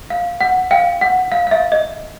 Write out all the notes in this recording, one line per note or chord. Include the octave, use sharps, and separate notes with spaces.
F5
F#5
F5 G5
F#5
F5
F5
E5
D#5